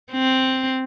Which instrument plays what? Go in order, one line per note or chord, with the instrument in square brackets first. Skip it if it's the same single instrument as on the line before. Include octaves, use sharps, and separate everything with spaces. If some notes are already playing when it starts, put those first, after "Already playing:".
[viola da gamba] C4